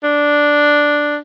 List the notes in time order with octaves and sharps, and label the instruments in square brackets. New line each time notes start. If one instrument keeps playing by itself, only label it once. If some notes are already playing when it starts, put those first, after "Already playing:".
[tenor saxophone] D4